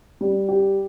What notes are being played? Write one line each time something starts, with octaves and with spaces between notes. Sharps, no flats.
G3
G4